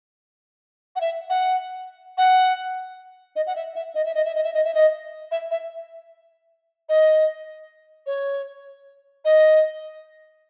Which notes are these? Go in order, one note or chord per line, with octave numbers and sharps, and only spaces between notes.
F#5
E5
F#5
F#5
D#5
F#5
E5
E5
D#5
E5
D#5
E5
D#5
E5
D#5
E5
D#5
E5
E5
D#5
C#5
D#5